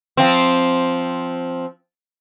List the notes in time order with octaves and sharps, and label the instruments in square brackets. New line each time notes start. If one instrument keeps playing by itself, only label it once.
[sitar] F3 C4